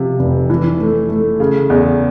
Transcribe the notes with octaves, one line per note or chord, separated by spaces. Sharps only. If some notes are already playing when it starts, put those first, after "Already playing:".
Already playing: C3 F3
F1
E3
A3
A3
C#3
E2